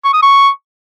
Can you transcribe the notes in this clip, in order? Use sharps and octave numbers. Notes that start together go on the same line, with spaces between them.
C#6
D#6
C#6